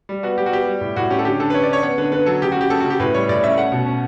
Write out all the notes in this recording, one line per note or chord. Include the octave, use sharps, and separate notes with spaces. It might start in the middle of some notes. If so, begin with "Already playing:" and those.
G3
B3 F#4
G3 G4
F#4
B3 G4
G3
A2
A2 F#4
C#4 G4
A4
D3 G4
D3 A4
B4
C#4 C#5
D5
C#4 C#5
B3 C#5
D3 B4
D3 B4
F#3 A4
C#3 G4
F#4
C#3 G4
C#3 A4
F#4
C#3
G4
A2 B4
G3 C#5
A2 D5
C#4 E5
A3 F#5
B2
C#4